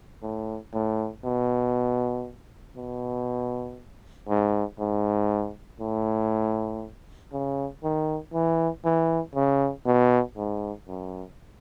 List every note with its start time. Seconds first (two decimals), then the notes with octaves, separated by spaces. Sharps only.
0.23 A2
0.73 A2
1.24 B2
2.76 B2
4.29 G#2
4.79 G#2
5.80 A2
7.32 C#3
7.83 D#3
8.33 E3
8.84 E3
9.35 C#3
9.86 B2
10.37 G#2
10.88 F#2